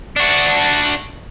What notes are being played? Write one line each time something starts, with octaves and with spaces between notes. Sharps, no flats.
D4 F#4